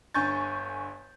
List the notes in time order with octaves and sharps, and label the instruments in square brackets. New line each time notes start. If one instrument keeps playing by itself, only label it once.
[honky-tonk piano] G1 D3 G#5 C#6 G6 A6